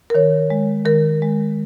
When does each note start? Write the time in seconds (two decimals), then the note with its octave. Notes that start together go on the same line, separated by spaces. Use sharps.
0.10 A#4
0.14 D#3 C#5
0.50 G#3
0.85 D#3 A#4
1.22 G#3